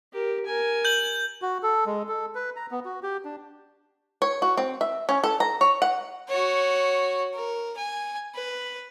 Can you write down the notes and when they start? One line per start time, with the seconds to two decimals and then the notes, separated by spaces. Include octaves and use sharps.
0.13 G4 A#4
0.46 A#4 G#5
0.85 G6 F#7
1.42 F#4
1.63 A4
1.86 G#3
2.08 A4
2.35 B4
2.56 A#5
2.71 B3
2.85 F#4
3.03 G4
3.25 D4
4.22 C#5
4.42 F#4
4.57 C4
4.81 E5
5.09 C#4
5.24 A4
5.40 A#5
5.61 C#5
5.82 F#5
6.28 F#4 C#5
7.34 A#4
7.77 G#5
8.35 B4